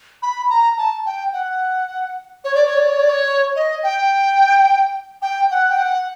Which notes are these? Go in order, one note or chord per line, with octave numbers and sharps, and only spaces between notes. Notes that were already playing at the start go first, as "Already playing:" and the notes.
B5
A#5
A5
G5
F#5
C#5
D5
C#5
D5
C#5
D5
C#5
D#5
G5
G5
F#5
G5
F#5